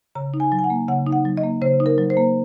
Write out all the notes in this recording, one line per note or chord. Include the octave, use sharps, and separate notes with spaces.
C#3 A#5
D#4
G#5
F#3
G#5
F#5
A#3
C#3 F#5
D#4
F#5
F#3
D#5
A#3
C#3 C5
D#4
A#4
F#3
C5
A#3